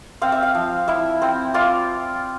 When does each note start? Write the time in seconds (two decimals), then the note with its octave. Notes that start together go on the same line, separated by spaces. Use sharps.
0.22 C4 F5
0.32 E5
0.43 F5
0.55 F3
0.88 E4 E5
1.22 C4
1.54 F4 D5